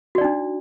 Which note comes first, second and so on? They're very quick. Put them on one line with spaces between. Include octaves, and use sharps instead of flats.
F#4 D5 D#4 D4